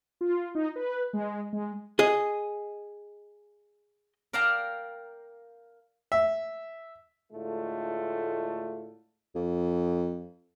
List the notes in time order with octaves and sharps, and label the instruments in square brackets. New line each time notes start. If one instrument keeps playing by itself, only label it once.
[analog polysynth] F4
D#4
B4
G#3
G#3
[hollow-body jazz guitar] G#4 D#5
[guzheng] A#4 D5 F5 G5 A5 A#5
[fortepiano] E5
[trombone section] A2 D3 G#3 A3 D4 F4
[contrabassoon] F2